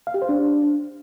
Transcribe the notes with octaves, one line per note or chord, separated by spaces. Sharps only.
F5
G4
C5
D4